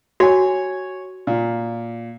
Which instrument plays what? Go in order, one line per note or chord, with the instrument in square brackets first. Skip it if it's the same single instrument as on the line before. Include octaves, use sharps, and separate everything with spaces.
[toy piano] F#4 [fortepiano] C#5 G#5
[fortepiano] A#2